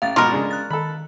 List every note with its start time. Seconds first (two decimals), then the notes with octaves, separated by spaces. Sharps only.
0.02 A1 F5 A6
0.16 G#2 B2 F4 A#4 D6
0.32 C#3 G#3 D4
0.51 F#6 A6
0.71 D#3 A4 B5